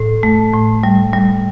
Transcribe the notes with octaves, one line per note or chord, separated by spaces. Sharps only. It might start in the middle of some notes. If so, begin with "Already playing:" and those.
Already playing: A2 A4
A3
A2
G3
G3